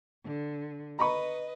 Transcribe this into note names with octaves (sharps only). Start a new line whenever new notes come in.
D3
B4 D#5 A#5 B5 C#6